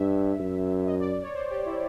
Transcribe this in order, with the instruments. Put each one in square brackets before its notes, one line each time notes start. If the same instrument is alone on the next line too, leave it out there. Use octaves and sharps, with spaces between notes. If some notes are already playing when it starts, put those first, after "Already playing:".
Already playing: [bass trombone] G2 [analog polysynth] E5
[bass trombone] F#2
[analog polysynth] D#5
D5
C#5
C5
G4
E4